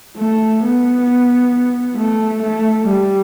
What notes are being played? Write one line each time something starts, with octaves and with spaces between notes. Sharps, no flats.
A3
B3
A3
A3
G3